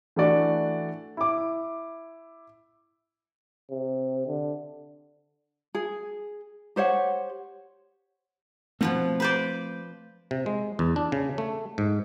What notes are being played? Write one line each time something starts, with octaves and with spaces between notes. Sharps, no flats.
E3 A3 D4 F#4 D5
E4 D6
C3
D3
G#4
G4 C5 C#5 F#5
B2 F3 A3 C4 F#5
B4 C5 D5
C3
G#3
E2
D4
C#3
A3
G#2